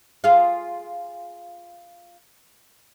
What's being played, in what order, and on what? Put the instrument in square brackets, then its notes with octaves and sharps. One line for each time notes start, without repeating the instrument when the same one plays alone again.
[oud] F4 G#4 F5